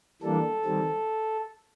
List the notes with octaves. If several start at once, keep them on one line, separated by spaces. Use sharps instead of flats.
E3 G3 A#3 D4 A4
D#3 G3 C4